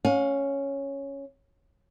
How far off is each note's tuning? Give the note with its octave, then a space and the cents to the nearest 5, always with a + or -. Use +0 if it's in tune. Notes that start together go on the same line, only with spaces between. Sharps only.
C#4 +0 F5 +35